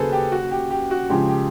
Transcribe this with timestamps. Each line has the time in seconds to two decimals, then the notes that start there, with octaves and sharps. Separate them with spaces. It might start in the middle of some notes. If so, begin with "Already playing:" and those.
Already playing: D#2 C#3 F#3 G#4 A4 B4 C5
0.13 G4
0.32 F#4
0.51 G4
0.71 G4
0.91 F#4
1.10 C#3 F3 G#3 G4
1.29 G4